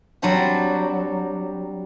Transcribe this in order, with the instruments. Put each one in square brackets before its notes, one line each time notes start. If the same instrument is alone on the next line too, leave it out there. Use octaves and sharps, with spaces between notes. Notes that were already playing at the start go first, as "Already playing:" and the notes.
[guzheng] F#3 G3 C4 D4 G4